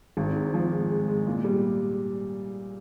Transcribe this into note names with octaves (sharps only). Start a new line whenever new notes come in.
G#1
G#2
F3
G#3
G#3
G#3
A#2
G3